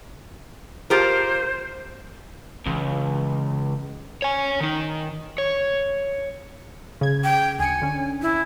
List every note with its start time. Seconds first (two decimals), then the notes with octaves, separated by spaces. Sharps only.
0.90 F4 G4 A#4 C5
2.66 C#2 E3
4.22 C#5 G#5
4.61 D#3 D#4
5.38 C#5
7.01 C#3 G#6
7.24 G5
7.59 D2 G#5 C#7
7.82 D3 C#4
8.22 E4